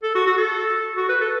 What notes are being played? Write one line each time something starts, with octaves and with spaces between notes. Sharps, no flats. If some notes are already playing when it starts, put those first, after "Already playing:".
A4
F#4
F#4
A4
F#4
B4
A4